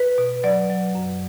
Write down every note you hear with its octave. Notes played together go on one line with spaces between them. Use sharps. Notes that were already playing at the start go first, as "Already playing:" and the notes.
Already playing: B4
B2
F#3 D5
F#3
F#2